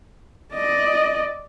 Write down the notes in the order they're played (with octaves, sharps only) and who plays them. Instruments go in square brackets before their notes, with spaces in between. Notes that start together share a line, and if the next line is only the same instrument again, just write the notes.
[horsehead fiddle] D5 D#5